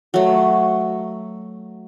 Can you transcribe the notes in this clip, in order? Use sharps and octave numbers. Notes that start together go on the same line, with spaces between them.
F#3 A3